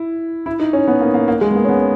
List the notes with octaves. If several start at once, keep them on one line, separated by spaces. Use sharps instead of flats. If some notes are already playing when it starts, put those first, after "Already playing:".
Already playing: E4
E4
D#4
C#4
B3
A#3
A#3
A#3
G#3
B3
A#3
C#4
B3